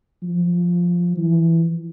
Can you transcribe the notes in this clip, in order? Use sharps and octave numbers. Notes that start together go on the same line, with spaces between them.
F3
E3